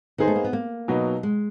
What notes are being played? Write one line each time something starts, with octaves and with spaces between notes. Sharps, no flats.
D#3 B3 D#4 G#4 C5
A3
A#3
B3
A#3
B2 F#3 B3 D#4
G#3